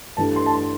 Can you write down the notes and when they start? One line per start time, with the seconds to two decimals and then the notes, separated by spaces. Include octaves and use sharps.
0.17 G2 E3 A3 D4 A5
0.36 C6
0.46 A5
0.54 C6